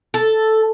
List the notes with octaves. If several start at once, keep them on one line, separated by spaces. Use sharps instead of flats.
A4